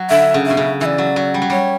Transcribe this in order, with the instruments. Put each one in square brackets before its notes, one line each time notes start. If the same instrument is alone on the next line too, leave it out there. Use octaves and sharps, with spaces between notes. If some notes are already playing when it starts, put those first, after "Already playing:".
Already playing: [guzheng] F#3
[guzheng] D3 [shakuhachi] E5
[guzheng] C#3
[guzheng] B2 [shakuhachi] E5
[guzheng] C#3
[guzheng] E3 [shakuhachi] D5 E5
[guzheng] F#3
F#3
G3
F#3
[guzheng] G3 [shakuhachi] C#5